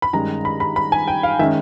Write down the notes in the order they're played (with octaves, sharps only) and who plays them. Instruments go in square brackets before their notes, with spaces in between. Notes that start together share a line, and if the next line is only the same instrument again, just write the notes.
[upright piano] B5
G2 D#3 G#3 C#4 A#5
B5
B5
B5
G#5
G5
F5
D#3 G#3 C#4 E5